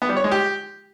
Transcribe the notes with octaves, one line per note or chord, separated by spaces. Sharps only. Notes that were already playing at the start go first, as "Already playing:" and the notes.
B3
G3
C#5
G#3
G4